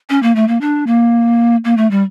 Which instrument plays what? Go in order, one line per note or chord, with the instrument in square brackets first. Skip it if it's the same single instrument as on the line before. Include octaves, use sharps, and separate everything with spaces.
[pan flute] C#4
A#3
A3
A#3
D4
A#3
A#3
A3
G3